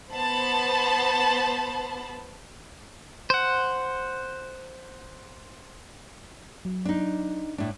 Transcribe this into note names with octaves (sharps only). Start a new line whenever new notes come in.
B3 C5 A5 B5
C5 F#5
F#3
D4 D#4
A2 D4